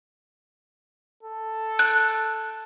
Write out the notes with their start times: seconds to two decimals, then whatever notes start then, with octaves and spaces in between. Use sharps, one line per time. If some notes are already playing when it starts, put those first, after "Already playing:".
1.23 A4
1.79 F#6